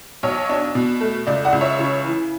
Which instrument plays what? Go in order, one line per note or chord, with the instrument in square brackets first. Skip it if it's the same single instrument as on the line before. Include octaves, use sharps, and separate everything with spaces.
[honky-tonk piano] B1 C#5
D4
B2
A3
C#2 D5
D5 F#5
C#2
C#5 E5
C#3
E3